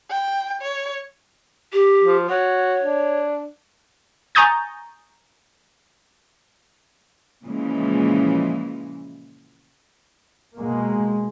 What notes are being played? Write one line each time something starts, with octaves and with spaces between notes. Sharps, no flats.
G5
C#5
G4
F3
F#4 C#5
D4
G#5 A#5 C#6 D#6 G6 A6
A#2 C#3 E3 F3 G#3
B2 G#3 A#3